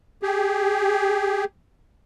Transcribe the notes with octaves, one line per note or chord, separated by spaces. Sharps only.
G4 G#4